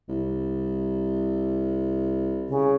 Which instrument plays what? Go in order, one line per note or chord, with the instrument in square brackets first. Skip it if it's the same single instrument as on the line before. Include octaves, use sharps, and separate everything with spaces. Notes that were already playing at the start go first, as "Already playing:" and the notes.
[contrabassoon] C2
[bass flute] C#3